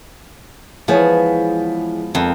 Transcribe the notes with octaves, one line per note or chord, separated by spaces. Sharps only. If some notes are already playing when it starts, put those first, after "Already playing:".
E3 F3 G#3 B3 G#4 C#5
F2 D#3